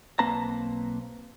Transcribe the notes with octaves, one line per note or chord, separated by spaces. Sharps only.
B1 A#3 C4 B4 A5 A#5